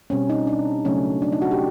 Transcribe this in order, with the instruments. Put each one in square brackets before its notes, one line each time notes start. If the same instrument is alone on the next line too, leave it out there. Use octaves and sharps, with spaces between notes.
[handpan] B2 G3 C4 C#4
D#4
D4
C#3 F#3 A3 C#4
D4
D#4
F#4
G4